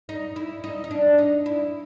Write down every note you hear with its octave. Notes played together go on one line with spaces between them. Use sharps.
D#4
E4
D#4
D#4
D4
D#4
E4